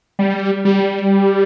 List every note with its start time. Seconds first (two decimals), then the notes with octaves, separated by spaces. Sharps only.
0.19 G3
0.65 G3